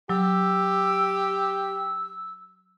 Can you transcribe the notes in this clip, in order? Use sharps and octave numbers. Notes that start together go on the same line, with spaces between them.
F#3 G4 E6